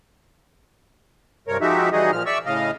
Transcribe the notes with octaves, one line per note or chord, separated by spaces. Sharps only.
G2 C3 A#4 C#5
F3 G#3 D#4 F#4 G4 E5
E3 G3 D#4 F#4 G#4 D#5
A#2 F3 F6
D5 E5 C#6 E6
A2 C#3 D#5 F5